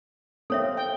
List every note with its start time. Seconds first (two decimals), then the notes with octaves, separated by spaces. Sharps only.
0.50 A#3 C4 A4 C#5 E5
0.77 G5